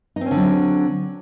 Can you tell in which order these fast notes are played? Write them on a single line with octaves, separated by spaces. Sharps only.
D#4 C4 C#4 D3 F#3